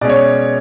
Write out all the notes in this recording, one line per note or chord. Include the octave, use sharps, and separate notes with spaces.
B2 G#3 C#4 D5
C#5